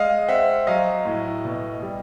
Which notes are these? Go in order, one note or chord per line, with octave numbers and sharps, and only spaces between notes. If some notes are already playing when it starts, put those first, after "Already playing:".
Already playing: G#3 D#5 F5
C4 E5 F#5
F#3 D#5 F5
A2
B2
G3